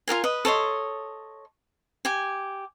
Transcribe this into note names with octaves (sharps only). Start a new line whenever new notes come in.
F4 G#4 A#4 G#5
B4 D#5
A4 C#5 D#5 C6
G4 G#5